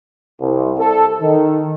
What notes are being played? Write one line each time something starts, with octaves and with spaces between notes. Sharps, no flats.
C2
A4
D#3